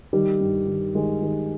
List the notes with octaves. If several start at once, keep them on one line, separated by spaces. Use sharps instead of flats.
D#3 G3
G2
D#3
D#3 G#3
D#3